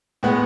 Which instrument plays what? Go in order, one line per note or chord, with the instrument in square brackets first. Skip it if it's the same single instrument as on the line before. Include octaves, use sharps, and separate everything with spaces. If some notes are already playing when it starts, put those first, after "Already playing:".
[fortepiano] A2 G#3 B3 F#5